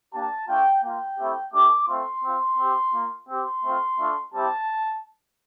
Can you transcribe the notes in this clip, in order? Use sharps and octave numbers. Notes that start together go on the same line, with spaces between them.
A#3 D4 G4 A5
A3 D4 F4 G5
A#3 F4 G5
A3 C4 E4 G4
A3 D4 G4 D6
A3 C4 F4 C6
C4 F4
C4 G4
A#3 F4
C4 G4 C6
A3 C4 F4
A3 D4 F4
G3 C4 E4 G4 A5